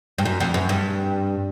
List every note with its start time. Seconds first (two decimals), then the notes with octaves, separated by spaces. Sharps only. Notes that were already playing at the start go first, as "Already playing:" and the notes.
0.18 G2
0.25 F#2
0.40 F2
0.54 F#2
0.69 G2